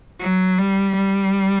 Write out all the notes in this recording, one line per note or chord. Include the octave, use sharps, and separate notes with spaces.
F#3
G3
G3